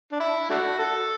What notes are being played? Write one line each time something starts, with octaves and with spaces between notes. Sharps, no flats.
D4
E4
A3 D4 F#4
A4